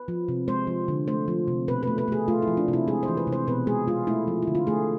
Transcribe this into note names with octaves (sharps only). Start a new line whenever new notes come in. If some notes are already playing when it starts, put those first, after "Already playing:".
Already playing: B4
F3
C3
G#3 C5
F3
D3
A3 C5
F3
C3
B2 B4
A3 B4
B4
A3 G#4
A3 F4
E4
F3
D4
C3 E4
G#3 G#4
C5
E3
B4
C3
C5
B2 B4
G#3 G#4
G#3 F4
A3 E4
F3
E4
D3
F4
A3 G#4